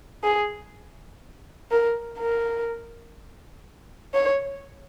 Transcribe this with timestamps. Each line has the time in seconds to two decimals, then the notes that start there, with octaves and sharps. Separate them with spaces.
0.24 G#4
1.71 A#4
2.19 A#4
4.14 C#5